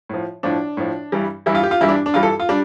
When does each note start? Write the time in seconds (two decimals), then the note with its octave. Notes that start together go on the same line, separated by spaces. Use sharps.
0.09 A2 F3
0.43 A2 F3 D4
0.77 A2 F3
1.12 G2 E3 G3
1.46 G2 E3 G3 E4
1.55 F4
1.63 G4
1.71 F4
1.81 G2 E3 G3 E4
1.88 D4
2.06 D4
2.14 G2 E3 G3 F4
2.23 A4
2.40 F4
2.49 G3 D4